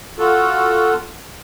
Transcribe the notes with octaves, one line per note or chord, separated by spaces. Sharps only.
F4 F#4 A4